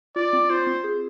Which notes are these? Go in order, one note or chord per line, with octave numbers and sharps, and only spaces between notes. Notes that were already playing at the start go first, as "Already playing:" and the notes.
F4 D5
C4
F4 C5
C4
G#4